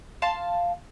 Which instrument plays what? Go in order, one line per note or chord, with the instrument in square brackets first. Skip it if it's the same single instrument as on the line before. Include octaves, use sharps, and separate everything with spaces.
[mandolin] F5 A5 C6